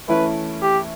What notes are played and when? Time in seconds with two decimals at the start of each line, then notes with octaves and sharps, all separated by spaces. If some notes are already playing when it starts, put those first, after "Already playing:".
0.08 E3 A3 C#4 E4 B4
0.62 G4